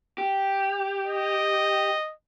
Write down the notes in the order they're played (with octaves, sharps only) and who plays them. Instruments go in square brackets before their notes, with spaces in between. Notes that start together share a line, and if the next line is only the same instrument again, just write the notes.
[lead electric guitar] G4
[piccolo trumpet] D#5